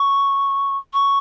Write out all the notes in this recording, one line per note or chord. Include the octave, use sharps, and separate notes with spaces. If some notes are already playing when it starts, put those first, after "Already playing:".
Already playing: C#6
C#6